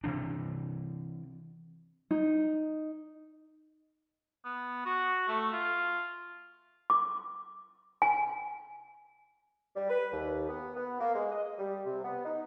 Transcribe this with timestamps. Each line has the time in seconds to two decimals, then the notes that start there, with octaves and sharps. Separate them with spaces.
0.04 C3 E3 D4
2.11 D#4
4.45 B3
4.85 F#4
5.28 A3
5.53 F4
6.90 D6
8.02 G#5
9.75 G3
9.90 B4
10.12 D#2
10.49 B3
10.76 B3
11.00 A#3
11.14 G#3
11.31 D#5
11.59 G3
11.85 C3
12.03 B3
12.25 D#4